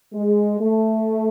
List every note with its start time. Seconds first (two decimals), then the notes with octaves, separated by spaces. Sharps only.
0.13 G#3
0.61 A3